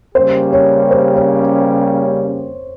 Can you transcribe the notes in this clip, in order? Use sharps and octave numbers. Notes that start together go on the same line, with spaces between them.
C#3 G3 A#3 C#4 G4 C5
C#5
C5
C#5